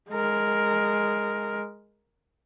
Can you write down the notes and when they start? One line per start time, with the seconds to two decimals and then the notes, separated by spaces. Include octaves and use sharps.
0.11 G#3 A#4